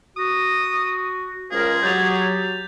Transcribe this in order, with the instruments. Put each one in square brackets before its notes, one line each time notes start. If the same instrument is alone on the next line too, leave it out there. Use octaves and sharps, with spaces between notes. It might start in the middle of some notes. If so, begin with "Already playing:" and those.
[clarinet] F#4 [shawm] D#6
[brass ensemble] C#2 F4 C5 [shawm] G#4 [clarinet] A#4
[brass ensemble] F#3 [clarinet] G4 [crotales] G6 A6 F7